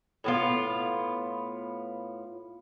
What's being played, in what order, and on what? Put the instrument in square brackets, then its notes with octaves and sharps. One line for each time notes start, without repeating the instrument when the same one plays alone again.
[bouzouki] A2 B3 F4